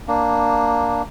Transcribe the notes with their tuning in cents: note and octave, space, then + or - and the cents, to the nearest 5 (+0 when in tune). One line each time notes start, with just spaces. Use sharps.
A#3 +0 D4 +0